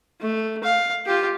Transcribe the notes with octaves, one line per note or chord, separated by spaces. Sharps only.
A3
F5
F4 G4